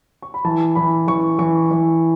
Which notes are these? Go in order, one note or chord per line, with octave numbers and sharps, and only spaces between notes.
C#6
B5
E3 A5
E3 B5
E3 C#6
E3 C#6
E3